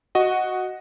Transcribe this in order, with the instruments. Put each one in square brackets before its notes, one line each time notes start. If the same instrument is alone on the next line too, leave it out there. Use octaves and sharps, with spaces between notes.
[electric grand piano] F#4 D#5 F#5